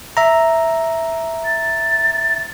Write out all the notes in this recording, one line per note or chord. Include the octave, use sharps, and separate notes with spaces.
E5 A#5
A6